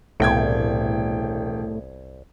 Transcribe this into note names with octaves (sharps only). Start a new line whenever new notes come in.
E1 C2 A2 G5 G#6